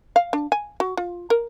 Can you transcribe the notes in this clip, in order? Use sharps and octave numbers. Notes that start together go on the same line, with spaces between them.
F5
D4
G#5
F#4
F4
A#4